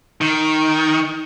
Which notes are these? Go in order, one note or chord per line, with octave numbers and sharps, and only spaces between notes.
D#3